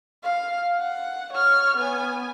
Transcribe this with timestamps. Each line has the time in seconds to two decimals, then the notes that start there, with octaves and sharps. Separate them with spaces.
0.24 F5
0.79 F#5
1.33 C#5 F6
1.77 B3 G#5